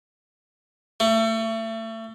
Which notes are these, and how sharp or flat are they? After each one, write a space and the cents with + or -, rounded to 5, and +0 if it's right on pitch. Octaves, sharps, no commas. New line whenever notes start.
A3 +30